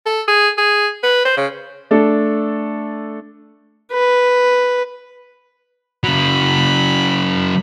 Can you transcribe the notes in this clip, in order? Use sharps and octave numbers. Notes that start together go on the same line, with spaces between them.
A4
G#4
G#4
B4
C5
C#3
A3 D4 A4
B4
C#3 F#3 B5